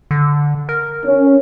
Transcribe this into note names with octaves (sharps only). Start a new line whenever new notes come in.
D3
A#4
C#4